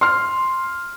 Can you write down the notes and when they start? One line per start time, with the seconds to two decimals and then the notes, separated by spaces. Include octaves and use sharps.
0.01 C6 F6